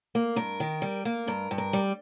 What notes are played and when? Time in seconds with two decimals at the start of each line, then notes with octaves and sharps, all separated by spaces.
0.15 A#3
0.36 G2 A#4
0.60 D#3
0.82 G3
1.05 A#3
1.28 G2 A#4
1.51 G2
1.58 A#4
1.73 G3